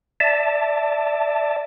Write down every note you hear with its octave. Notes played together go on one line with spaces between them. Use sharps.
D5 E5 A5